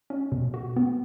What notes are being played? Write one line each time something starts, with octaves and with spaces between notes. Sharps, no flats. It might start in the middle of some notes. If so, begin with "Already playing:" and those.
C#4
B2
F#4
B3